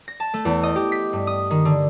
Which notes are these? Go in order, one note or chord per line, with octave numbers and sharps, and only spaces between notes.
A#6
A5
A3
E2
D#5
G4
B6
G2
D#6
D#3
D3